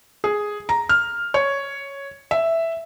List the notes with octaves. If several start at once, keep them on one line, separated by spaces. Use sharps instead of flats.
G#4
A#5
F6
C#5
E5